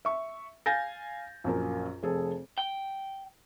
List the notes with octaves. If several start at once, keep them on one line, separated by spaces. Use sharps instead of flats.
E5 C#6
F5 G#5 G6 A6 A#6
A#1 F#2 A#4
F1 G#4 A4
G5